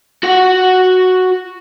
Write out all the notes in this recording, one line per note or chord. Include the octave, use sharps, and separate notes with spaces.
F#4 F#5